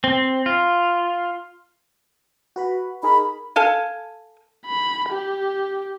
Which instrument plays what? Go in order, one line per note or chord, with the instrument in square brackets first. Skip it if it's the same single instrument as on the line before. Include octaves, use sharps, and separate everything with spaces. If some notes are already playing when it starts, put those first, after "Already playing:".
[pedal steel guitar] C4
F4
[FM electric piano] F#4 B4 B5
[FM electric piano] D#4 G#4 A#4 [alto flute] B5
[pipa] A4 F5 G#5
[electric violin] B5
G4